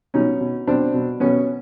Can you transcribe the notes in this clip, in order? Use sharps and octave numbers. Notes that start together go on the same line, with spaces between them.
B2 C#4 D#4
B2
B2 C4 D4
B2
B2 B3 C#4